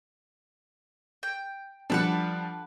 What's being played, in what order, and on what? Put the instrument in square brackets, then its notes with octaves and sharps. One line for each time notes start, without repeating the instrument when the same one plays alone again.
[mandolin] G5
[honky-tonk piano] F3 G3 D4 [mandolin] A4 B4 F#5